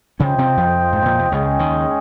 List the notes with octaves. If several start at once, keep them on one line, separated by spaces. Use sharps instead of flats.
C#3 C#4 F4 C5 D#5 G5
C3 C4
F2 F3
G#2
A#2
C3
C#2 C#3 G#3 C#4 G#4 D#5 G5
D#2 D#3